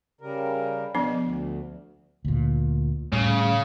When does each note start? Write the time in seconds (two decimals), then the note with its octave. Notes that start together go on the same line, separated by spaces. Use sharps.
0.21 C#3 G3 A#4
0.95 B2 F3 B3 D4
1.22 D2
2.25 D2 A#2
3.13 A2 C#3 G3